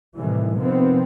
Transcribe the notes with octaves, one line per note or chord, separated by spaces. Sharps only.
A2 C3 D#3 E3 G3
C3 D#3 F3 B3 C4